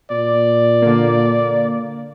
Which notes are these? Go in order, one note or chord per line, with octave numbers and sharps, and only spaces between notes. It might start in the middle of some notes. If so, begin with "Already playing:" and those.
A#2 D5
D3 A#3